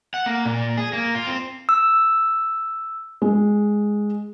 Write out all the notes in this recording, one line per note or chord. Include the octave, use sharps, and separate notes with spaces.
F#5
A#3
A#2
G#4
A#3
F4
C4
E6
G#3